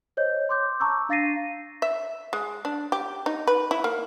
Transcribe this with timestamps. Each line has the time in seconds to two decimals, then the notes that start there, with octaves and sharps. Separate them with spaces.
0.17 C5 C#5 D#5 G6
0.49 C6 D6 G6
0.80 A5 A#5 C#6 D6 E6 G6
1.09 D4 F5 A6 A#6 C7 D#7
1.82 E5
2.33 G#3
2.65 D4
2.92 G4
3.26 D#4
3.47 B4
3.71 E4
3.84 A#3